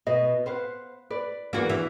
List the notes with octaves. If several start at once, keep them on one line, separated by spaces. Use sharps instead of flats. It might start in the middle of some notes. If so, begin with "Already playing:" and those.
B2 D#5
B4 C5 F5 F#5
B4 D5
E2 A#3 F#4 D5
E3 D4